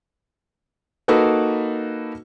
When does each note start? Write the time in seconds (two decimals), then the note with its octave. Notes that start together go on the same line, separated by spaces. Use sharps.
1.08 A#3 D#4 F#4 A4 B4